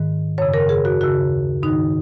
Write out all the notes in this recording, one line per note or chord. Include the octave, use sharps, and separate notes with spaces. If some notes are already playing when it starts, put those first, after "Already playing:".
Already playing: G#2 D#3
F#2 C#3 C#5
A#4
G#4
F#4
D#2 C#3 F#4
G#2 D#3 D#4